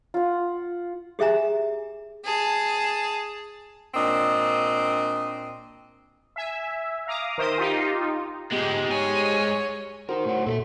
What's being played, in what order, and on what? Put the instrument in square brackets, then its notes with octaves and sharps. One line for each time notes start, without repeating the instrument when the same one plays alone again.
[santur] F4 F#5
[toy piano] G4 G#4 E5 G#5 A#5
[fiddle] G#4 A5
[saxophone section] A#2 C4 D4 D#5
[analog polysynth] E5 G#5
F5 A#5 D6 D#6
D#3 A#4 C5 E5 D#6
D#4 F4 G4
[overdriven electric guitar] G#2 G#3 [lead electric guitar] B3 F4 [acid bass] G4
[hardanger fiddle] C#5 [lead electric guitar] G#5
[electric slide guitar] D#4 A#4 [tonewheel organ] F#4 C5
[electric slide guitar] A2 C#5 F#5
[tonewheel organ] A#2 [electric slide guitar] A4 D#5 E5